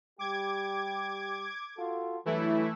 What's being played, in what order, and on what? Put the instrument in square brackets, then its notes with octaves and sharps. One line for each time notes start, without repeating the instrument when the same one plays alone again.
[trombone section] G3 G4 [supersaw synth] D6 G#6
[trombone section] F4 F#4 A4
[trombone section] G2 F#3 [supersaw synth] E3 A3 E4